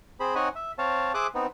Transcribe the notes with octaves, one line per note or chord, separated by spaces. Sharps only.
C4 G#4 C5 B5
C4 D#4 C#5 D#5 F#5 G#5
E5
C4 C#5 F5 A5
G#4 C5 E5 D6 D#6 F#6
B3 C4 D#4